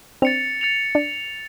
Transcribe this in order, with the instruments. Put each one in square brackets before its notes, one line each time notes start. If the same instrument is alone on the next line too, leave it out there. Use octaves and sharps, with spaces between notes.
[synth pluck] C4 D4 [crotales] A6 C#7 F7
[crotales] A6 C#7 F7
[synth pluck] D4